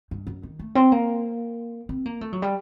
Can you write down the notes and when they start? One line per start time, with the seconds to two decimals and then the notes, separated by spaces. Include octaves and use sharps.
0.11 G2
0.27 F#2
0.43 D#3
0.59 A3
0.75 C4
0.92 A#3
1.89 C4
2.06 A#3
2.21 A3
2.33 F#3
2.42 G3